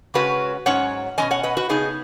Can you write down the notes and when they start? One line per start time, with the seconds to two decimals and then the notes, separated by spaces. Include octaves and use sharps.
0.14 C#3 G#3 C#4 F#4 B4
0.66 G#2 F#3 C#4 C#5 F#5
1.18 B2 G#3 C#4 D#5 G#5
1.31 C#5 F#5
1.43 B4 D#5
1.57 F#4 B4
1.69 C#3 B3 D#4 G#4